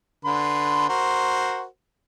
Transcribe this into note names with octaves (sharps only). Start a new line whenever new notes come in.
D3 B4 C6
F#4 A#4 C5